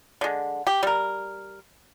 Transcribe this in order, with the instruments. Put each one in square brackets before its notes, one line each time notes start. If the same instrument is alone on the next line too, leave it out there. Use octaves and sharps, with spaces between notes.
[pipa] D3 G#3
G4
G3 A#4